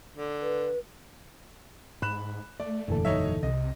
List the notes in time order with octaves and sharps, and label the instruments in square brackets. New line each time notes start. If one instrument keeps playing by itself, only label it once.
[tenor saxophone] D3
[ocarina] B4
[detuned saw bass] G#2 [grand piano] B5 F#6 E7
[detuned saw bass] A3 [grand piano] D5
[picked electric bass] F#1 E2 A#2 [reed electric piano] D3 E3 A4
[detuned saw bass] F#3 [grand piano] D#4 C#5 E5
[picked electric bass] C2 [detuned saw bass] C3 [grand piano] D#5